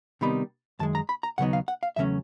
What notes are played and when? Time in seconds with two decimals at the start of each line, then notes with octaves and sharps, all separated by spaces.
0.21 C3 D#3 G3 B3 D#4 B5
0.79 F#2 D#3 G#3 A5
0.95 A#5
1.09 B5
1.23 A#5
1.38 D#2 C#3 F#3 B3 D#4 F#5
1.53 F5
1.68 F#5
1.83 F5
1.96 E2 C#3 F#3 A3 C#4 E5